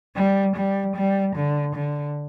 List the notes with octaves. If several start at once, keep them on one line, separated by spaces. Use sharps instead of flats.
G3
G3
G3
D3
D3